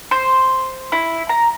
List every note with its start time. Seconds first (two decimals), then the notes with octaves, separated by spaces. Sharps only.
0.11 C5
0.92 E4
1.29 A#5